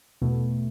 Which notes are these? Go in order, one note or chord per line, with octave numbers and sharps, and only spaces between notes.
E2 B2 A3